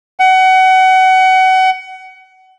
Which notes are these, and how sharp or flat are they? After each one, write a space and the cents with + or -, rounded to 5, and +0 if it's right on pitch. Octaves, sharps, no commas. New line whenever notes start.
F#5 +25